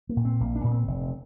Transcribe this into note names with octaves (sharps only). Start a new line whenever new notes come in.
A#3
A#2
C4
A#1 A#3
D4
A#2 A#3
C4
F1